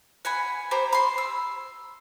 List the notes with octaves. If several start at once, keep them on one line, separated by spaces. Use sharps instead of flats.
F#5 G#5 B5
G4 C5 A#5 B5
B5 C6
E6